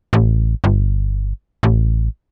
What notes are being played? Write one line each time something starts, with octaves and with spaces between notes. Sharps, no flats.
A1
G1
A1